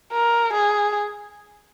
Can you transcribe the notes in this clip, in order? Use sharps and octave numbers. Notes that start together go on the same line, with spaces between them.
A#4
G#4